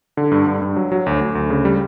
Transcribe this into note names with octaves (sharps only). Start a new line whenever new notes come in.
D3
G2
G2
G2
F#3
F#3
D2
D2
D2
C#3
G3